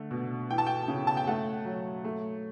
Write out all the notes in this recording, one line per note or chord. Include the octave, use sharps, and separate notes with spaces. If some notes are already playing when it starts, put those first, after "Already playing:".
Already playing: D3 A3
B2
E3 G5
A5
G5
C#3
A5
G5
A3 F#5
F#3
A3